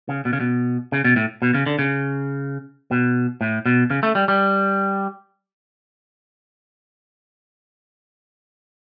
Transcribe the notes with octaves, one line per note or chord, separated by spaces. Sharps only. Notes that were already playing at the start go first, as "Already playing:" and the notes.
C#3
B2
C#3
B2
C#3
B2
A2
B2
C#3
D3
C#3
B2
A2
B2
C#3
A3
G3
G3